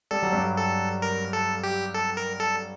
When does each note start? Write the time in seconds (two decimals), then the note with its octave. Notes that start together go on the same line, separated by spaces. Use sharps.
0.11 G3 A4
0.22 F#3
0.32 G2 G3
0.57 A4
1.02 A#4
1.33 A4
1.63 G4
1.95 A4
2.17 A#4
2.40 A4